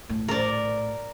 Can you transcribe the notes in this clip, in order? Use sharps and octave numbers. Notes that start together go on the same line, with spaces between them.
A#1 A2
A#4 D5